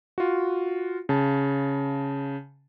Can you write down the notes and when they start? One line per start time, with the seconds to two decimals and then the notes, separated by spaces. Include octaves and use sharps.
0.18 F4 F#4
1.09 C#3 A5